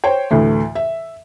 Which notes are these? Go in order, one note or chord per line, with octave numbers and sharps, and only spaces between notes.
C5 C#5 G5
D2 A2 E3
E5